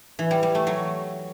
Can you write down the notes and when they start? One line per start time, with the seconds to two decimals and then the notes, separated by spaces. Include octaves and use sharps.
0.19 E3
0.31 G3
0.43 G3
0.55 A3
0.67 F#3